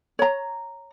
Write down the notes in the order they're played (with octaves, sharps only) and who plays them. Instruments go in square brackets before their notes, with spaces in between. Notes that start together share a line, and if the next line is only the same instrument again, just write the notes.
[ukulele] C#5 A#5